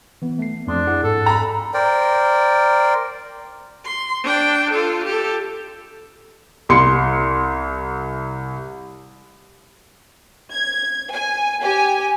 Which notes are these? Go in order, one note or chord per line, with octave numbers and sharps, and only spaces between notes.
E3 B3
A3 C7
F2 D4 C6 D#6
E4 G#4 F#5
G#2 A4
A#5 B5
A#4 C5 D5 G5
C6
D4 G5
F4 A4
G4 A4
C2 C6 C#7
G#6
G#5
G4 G#5